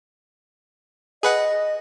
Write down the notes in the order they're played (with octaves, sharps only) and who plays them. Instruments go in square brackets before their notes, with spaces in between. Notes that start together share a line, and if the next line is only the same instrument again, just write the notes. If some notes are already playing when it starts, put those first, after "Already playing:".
[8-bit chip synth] G#4 B4 F#5 [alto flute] D#5